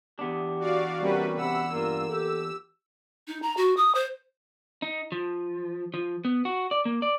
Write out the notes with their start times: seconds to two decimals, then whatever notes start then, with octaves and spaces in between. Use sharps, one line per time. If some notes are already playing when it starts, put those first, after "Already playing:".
0.19 E2 B3 D4 G4
0.60 F#4 D5 F5
1.00 C3 G3 A#3 C#4 F#4 B4
1.37 C3 F#5 B5 E6
1.72 G2 A#3 F4
2.09 G4 A4
3.28 D#4
3.42 A#5
3.57 F#4
3.77 D#6
3.95 C5
4.82 D#4
5.12 F3
5.94 F3
6.25 B3
6.45 F#4
6.71 D5
6.85 A#3
7.02 D5